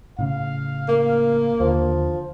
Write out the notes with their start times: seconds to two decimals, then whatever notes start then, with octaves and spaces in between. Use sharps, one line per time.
0.18 A2 C#3 F5
0.88 A#3
1.60 D#2 D3 F3